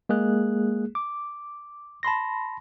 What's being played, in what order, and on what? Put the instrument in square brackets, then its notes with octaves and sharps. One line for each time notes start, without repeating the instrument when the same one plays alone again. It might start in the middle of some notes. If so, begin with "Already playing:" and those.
[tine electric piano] G#3 A#3 G#4 F#6
D6
A5 B5 C6 A#6